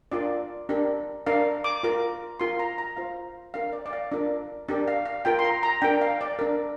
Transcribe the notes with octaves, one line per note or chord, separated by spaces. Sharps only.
D4 F4 A#4 D5
D4 G4 A#4
D4 A#4 F5
D6
F4 A#4
F4 A#4 C6
A#5
A#5
F4 C5 F5
D4 A#4 F5
D5
D5
F5
D4 F4 A#4
D4 G4 A#4 D5
F5
F5
F4 A#4 G5
C6
A#5
A#5
D4 A#4 G5
F5
D5
D4 A#4